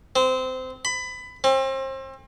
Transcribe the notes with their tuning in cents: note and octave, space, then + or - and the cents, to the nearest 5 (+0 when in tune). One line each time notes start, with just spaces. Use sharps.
C4 -20
B5 +20
C4 +35